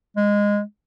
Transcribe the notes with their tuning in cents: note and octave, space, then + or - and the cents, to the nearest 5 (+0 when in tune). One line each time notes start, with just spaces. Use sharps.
G#3 -15